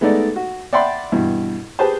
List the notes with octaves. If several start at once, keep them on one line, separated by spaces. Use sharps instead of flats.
G#3 A3 B3 D#4 A4 D5
F#4
D5 E5 F#5 G5 B5 C6
G2 B2 E3
G4 G#4 B4 C5 A5